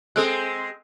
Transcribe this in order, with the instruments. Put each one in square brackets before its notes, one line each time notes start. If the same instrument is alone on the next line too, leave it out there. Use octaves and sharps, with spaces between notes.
[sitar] G#3 C4 [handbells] G#4 A4 F#6